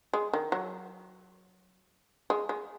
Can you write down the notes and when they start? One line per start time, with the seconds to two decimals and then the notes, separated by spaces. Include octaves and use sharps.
0.14 G#3
0.33 D#3
0.52 F#3
2.30 G#3
2.49 G#3